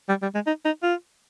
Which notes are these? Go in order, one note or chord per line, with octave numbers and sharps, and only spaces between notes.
G3
G3
G#3
D#4
D#4
F4